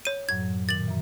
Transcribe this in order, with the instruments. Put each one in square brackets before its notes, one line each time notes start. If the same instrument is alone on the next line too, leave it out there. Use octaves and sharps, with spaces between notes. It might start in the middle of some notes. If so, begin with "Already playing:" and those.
[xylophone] C#5 D#7
[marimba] F#2 A2 F#3 [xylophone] G#6
[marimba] A#2 D#3 [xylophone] A6 F#7
[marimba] F#2 E3